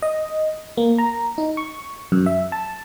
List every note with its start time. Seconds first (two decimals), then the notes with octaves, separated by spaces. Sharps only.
0.02 D#5
0.77 A#3
0.98 A#5
1.38 D#4
1.57 C#6
2.12 F#2
2.26 E5
2.52 A5